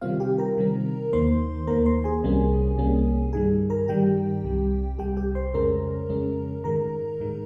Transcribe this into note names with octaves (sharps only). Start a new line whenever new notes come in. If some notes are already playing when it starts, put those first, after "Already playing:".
C3 D#3 G3 C4 F4 F5
G4 G5
A#4 A#5
C3 D#3 G3 C4
D#2 D#3 A#3 C5 C6
D#2 D#3 A#3 A#4 A#5
C5 C6
G#4 G#5
C2 C3 G3 A#3 C#4
C2 C3 G3 A#3 C#4
G2 D#3 G3 G#4 G#5
A#4 A#5
G2 D#3 G3 G4 G5
C2 C3 G3
C2 C3 G3 G4 G5
G4 G5
C5 C6
F2 C#3 G#3 C#4 A#4 A#5
F2 C#3 G#3 C#4
G#2 D#3 G#3 A#4 A#5
G#2 D#3 G#3